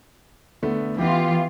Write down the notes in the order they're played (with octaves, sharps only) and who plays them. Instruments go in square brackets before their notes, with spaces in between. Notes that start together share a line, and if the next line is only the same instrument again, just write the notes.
[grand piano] D3 A3 B3
[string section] E3 F4 [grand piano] B3 G4